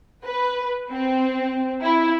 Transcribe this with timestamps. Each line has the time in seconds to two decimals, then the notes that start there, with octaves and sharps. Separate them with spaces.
0.23 B4
0.89 C4
1.82 E4